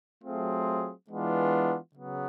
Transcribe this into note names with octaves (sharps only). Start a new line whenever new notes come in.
F#3 A3 C4 F4 G#4
E3 G#3 B3 D4 F4
C#3 F#3 B3